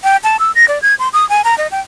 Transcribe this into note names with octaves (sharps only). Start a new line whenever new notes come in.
G5
A5
E6
A#6
D5
G#6
C6
D#6
G#5
A#5
D#5
G5